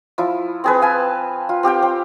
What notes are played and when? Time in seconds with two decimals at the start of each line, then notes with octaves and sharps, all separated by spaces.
0.18 F3 E4
0.64 C4 G#4 B4
0.82 F5 G#5 A5
1.49 F4
1.63 C4 G4 F5 G5
1.82 C4